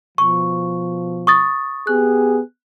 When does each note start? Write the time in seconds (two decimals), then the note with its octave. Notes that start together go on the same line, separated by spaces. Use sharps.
0.18 B2 F3 C#6
1.27 C#6 D#6 A6
1.87 B3 G4 G#4 F#6